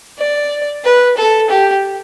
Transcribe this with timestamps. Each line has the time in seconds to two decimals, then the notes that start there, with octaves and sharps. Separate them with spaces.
0.18 D5
0.84 B4
1.17 A4
1.50 G4